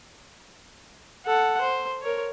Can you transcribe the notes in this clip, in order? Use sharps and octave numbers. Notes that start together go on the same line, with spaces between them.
A4 F#5
C5
A#4 C#5